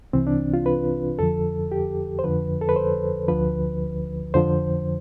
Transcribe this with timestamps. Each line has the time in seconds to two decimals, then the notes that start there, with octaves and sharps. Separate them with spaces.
0.13 C2 C3 E3 C4
0.27 D4
0.54 F4
0.66 B4
1.19 F2 D3 F3 A4
1.72 G4
2.19 C5
2.24 F2 D3 F3 B4
2.61 A4
2.69 B4
2.76 C5
3.28 D2 D3 F3 B4
4.34 F2 D3 F3 C5